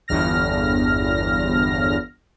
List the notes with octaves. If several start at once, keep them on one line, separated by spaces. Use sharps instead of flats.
G1 E2 F6 A#6